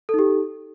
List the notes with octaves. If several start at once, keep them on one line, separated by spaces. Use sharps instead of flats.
D#4 G4 A4